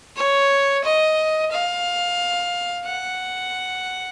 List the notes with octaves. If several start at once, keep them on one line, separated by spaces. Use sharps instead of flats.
C#5
D#5
F5
F#5